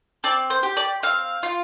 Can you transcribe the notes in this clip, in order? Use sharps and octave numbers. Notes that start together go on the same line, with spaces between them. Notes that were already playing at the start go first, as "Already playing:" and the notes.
C4 D5
C5
G4
D5
C4 F5
F4